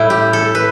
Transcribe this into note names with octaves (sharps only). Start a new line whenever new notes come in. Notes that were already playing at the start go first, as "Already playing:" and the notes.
Already playing: A2 G3 E4
G4
A4
B4